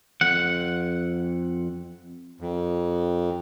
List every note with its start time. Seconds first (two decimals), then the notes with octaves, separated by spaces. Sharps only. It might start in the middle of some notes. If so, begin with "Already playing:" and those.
0.21 F2 F#5
2.41 F2